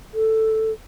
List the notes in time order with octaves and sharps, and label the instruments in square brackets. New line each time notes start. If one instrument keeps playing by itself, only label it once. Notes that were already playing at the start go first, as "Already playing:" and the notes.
[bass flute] A4